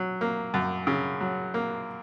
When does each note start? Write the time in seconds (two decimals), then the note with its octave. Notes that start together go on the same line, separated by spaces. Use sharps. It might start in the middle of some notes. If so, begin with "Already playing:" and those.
Already playing: F#3
0.21 A#3
0.54 F#2
0.87 C#3
1.21 F#3
1.54 A#3